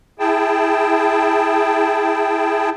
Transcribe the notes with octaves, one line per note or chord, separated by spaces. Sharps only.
E4 G#4 G5 A5